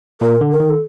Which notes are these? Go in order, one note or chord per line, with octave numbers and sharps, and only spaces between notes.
A#2 A#4
D3
A#4
D#3
A4